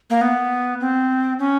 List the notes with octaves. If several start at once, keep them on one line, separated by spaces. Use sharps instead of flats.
A#3
B3
C4
C#4